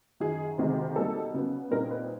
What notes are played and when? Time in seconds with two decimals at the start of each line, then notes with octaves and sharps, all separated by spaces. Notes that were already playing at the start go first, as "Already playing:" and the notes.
0.20 F#2 D#3 F#3 G#4
0.58 D2 C3 D#3 G#3 C4
0.96 B2 G3 A#3 D#4 A4
1.34 C#3 F#3 B3
1.71 A#2 G3 C4 D#4 A#4
1.91 B4